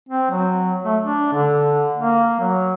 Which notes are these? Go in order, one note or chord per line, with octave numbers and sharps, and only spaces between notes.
C4
F#3
A3
D4
D3
A#3
F#3